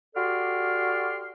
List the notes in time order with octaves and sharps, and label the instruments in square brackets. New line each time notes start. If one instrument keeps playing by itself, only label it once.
[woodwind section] F#4 G4 A4 D5 C6 F6